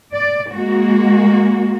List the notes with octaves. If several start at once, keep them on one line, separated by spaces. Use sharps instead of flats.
D5
G#3 A#3 F#4